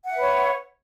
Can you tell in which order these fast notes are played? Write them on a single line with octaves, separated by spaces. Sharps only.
F#5 E5 B4 C#5